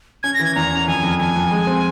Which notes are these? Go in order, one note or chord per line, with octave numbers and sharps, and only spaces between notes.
C#4 G#6
A#6
E3
G#6
E2 A#5
C#4
F2 G#5
F2
F2 G#5
F2
G#3
C4